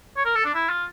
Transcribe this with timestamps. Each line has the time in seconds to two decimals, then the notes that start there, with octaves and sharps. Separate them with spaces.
0.17 C#5
0.25 A#4
0.35 A4
0.45 D4
0.54 E4
0.69 F4